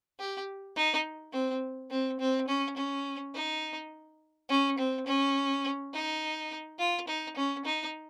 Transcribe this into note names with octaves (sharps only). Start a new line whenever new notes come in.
G4
D#4
C4
C4
C4
C#4
C#4
D#4
C#4
C4
C#4
D#4
F4
D#4
C#4
D#4